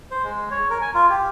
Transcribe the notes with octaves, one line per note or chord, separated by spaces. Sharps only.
C5
G#3
C#5
A#4
G#5
F4
G4